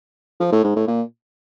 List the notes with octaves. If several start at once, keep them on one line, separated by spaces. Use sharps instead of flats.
F3
A2
G#2
A2
A#2